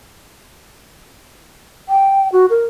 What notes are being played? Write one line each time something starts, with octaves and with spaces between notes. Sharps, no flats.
G5
F#4
A#4